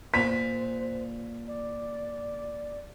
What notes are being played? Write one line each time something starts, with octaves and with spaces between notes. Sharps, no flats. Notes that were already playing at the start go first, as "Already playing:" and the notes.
A#2 C5 B6
D5